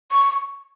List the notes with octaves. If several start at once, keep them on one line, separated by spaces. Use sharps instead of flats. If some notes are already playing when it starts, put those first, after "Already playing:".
C#6